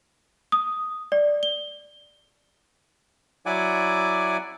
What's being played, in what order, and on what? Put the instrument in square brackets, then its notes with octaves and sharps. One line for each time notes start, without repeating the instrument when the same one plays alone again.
[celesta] D#6
D5
G7
[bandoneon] F#3 E4 D5 F#5 G#5 D6